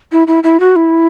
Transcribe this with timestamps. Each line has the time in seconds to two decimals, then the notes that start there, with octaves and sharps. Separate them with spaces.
0.12 E4
0.27 E4
0.43 E4
0.60 F#4
0.76 E4